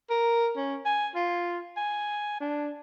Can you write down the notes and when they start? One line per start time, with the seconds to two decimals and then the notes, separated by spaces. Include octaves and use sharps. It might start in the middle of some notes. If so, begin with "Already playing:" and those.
0.10 A#4
0.57 C#4
0.86 G#5
1.16 F4
1.77 G#5
2.41 D4